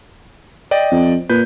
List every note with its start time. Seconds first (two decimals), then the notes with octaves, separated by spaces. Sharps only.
0.71 D5 D#5 G5
0.91 F2
1.29 A#2 B4 G6